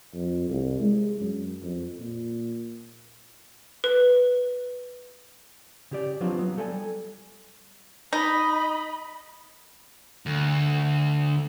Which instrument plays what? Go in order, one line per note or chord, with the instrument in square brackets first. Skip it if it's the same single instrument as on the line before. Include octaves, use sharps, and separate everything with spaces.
[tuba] F2
C2
G#3
F#2
F2
A#2
[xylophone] B4
[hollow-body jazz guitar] C#3 G4 D5
F3 F#3 B3 C4 D4 F4
F#3 B3
G3 A4 D5 D#5 G#5
[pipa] D#4 [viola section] D#5 B5
[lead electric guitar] D2